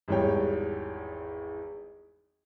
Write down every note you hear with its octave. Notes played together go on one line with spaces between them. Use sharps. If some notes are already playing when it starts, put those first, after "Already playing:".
G#1 E2 G3 C#5 G5